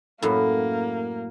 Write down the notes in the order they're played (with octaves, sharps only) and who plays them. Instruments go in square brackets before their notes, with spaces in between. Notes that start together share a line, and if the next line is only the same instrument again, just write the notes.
[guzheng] F#2 A2 [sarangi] A#3